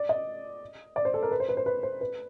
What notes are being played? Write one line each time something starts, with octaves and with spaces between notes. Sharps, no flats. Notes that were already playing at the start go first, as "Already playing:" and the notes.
Already playing: D5
D#5
D5
C5
A4
A#4
B4
C5
B4
C5
B4
C5
B4